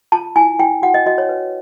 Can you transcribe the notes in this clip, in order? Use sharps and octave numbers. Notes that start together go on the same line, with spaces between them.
F4 A5
E4 G#5
E4 G5
F#4 F#5
D#5
F#4 D#5
C#5
B4